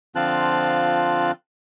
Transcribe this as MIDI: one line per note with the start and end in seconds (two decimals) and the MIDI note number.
0.16 1.31 50
0.16 1.31 53
0.16 1.31 60
0.16 1.31 65
0.16 1.31 81
0.16 1.31 90